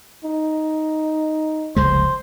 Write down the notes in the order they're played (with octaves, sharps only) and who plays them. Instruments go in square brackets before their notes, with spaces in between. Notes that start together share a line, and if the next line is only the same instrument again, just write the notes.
[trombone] D#4
[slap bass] F1 C#2 G#3 [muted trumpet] C5